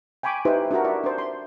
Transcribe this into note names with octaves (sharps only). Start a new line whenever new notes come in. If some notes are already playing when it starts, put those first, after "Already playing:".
G5 G#5 B5 C#6 D6
D#4 E4 G4 B4 C5
D4 E4 F#4 A#4
E4 D5 E5
D4 C5
C6